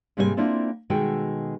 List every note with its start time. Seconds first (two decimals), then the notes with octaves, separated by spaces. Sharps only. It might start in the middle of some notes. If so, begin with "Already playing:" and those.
0.17 G#2 C3 G3 A#3 C5 G#5
0.37 A#3 C4 D4 E4 F4 A4
0.90 B2 D#3 G#3 F#4 A4 G5